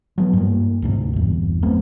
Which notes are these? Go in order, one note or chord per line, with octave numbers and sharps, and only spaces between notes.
F#3 B3
G2 A#3
D2 G#2 C3
G1 E2
F#3 A3 B3 C4